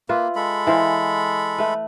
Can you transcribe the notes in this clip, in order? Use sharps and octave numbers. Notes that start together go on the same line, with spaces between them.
A#3 F4 B4 E5
G#3 A4 B5
E3 C5 F5
A3 B4